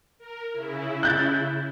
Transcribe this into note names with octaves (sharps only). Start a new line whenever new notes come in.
A#4
C#3 E4
F#6 G6 A6